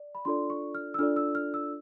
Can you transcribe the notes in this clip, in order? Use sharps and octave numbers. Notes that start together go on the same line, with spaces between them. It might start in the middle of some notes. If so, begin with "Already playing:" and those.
Already playing: D5
B5
D4 F4 A4 D5 C6
C#6
F6
E6
D4 F4 A4 D5 F6
E6
F6
E6